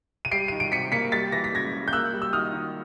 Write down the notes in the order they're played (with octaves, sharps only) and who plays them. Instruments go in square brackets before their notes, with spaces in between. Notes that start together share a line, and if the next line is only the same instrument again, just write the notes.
[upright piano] D#7
G3 C7 D7
D#3 D#7
D7
C3 B6 C#7
A#3 B6 C#7
G3 A6 B6
E3 A#6
B6
C#3 G#6 A#6
C#3
G6
A#3 E6 F#6
G3
E6
D#3 D#6 F6
D#3